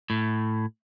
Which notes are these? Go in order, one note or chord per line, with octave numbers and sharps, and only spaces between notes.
A2